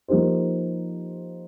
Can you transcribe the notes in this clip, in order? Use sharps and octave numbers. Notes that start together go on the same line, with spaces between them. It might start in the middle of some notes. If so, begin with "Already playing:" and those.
F3 A#3 D#4 G4 C5